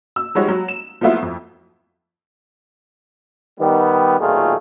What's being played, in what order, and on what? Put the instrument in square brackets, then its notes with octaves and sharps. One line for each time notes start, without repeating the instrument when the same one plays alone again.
[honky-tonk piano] E6
F3 G3 G#3 D#4 F#4 C#5
F#3
E7
F3 F#3 A3 B3 E4 F4
F2
[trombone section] D#3 G3 B3
B1 A#2 D#3 A3 F4 G#4